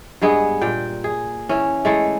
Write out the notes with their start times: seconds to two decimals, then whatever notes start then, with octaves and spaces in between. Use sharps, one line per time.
0.22 G2 G#3 B3 G#4
0.61 A#2 G5
1.04 G#4
1.49 E3 C#4
1.85 E3 G#3 A3